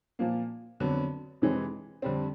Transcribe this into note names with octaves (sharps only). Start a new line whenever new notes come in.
A#2 F3 A#3
F2 D3 F#3 B3
F2 C3 E3 G#3 C4
F2 D3 G3 C4